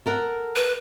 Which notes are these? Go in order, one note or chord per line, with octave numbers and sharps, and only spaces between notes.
A4 A#4 F#5
B4